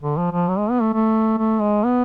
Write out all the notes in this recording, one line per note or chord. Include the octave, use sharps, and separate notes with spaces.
D3
F3
F3
F#3
G#3
B3
A3
A3
A3
G#3
B3